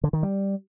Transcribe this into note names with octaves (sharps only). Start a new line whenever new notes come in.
D3
D#3
G3